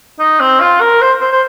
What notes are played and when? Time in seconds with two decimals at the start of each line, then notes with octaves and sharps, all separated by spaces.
0.20 D#4
0.40 C4
0.60 F4
0.81 A#4
1.01 C5
1.21 C5
1.32 C5